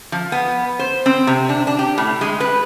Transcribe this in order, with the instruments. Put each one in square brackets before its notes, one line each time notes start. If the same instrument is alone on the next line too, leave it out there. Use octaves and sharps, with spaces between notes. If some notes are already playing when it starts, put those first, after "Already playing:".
[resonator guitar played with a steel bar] F3
B3
C5
C4
C3
D4
D4
G4
A2
G#3
B4